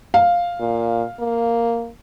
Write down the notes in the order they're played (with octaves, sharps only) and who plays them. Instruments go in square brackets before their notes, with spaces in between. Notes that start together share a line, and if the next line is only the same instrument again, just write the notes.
[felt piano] F5
[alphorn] A#2
A#3